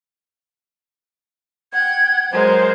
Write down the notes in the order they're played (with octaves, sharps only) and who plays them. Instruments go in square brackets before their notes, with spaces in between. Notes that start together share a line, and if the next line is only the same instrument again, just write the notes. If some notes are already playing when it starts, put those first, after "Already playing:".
[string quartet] F#5 G5 [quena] G#6
[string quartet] F#3 G#3 A#4 [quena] C5